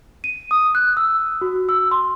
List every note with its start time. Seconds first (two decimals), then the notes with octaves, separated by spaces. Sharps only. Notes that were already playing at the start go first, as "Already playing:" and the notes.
0.24 D#7
0.51 D#6
0.75 F#6
0.97 E6
1.41 F#4
1.69 E6
1.91 C6